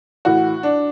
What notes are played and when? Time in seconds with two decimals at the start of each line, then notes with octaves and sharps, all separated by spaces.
0.25 A2 E3 F#4
0.63 D4